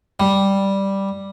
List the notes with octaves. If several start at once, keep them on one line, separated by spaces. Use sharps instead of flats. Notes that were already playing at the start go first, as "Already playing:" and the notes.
G3